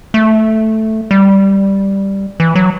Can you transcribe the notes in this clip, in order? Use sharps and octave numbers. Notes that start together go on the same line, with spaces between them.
A3
G3
E3
F#3